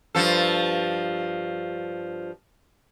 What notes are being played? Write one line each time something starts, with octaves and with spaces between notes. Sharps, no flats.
G2 F3 A4